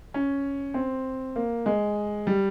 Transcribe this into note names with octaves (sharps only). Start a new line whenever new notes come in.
C#4
C4
A#3
G#3
G3